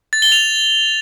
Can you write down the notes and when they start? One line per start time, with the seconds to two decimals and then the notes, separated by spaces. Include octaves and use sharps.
0.13 A6
0.22 G7
0.32 F7